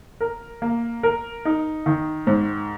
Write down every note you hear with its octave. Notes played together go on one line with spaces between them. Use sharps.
A#4
A#3
A#4
D#4
D#3
G#2